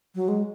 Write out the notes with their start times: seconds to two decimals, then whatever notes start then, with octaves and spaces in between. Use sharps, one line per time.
0.15 F#3
0.28 G#3